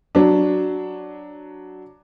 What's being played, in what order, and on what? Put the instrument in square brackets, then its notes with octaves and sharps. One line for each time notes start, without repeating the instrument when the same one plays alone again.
[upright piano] F#3 D4